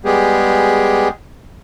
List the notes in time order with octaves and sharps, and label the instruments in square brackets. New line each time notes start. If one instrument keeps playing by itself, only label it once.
[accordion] G3 G#3 B3 G4 G#4